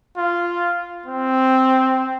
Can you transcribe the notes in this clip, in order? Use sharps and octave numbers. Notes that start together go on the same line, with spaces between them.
F4
C4